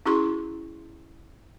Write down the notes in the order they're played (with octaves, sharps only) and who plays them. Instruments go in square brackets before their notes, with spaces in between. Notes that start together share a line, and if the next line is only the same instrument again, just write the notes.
[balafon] C#4 E4 F#4 G#4 C6 C#6